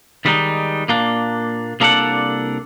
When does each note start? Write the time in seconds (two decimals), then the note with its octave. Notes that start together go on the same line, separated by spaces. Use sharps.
0.25 D#3 G3 G#3 C4 D#4
0.89 A#2 A#3 D4
1.80 C2 A#3 D4 A4 D5 F#5